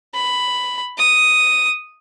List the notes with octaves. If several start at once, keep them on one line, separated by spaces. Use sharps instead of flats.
B5
D#6